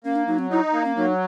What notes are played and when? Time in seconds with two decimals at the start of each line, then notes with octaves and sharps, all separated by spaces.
0.04 A#3 C#4
0.16 D4
0.27 F#3 D#4
0.39 C4
0.50 D#4 E4
0.73 A#3
0.84 C#4
0.96 F#3 D#4